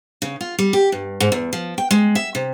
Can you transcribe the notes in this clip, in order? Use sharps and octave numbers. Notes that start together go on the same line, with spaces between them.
C#3
F4
G3
G4
G2
G#2
E2
F3
G5
G#3
E5
C3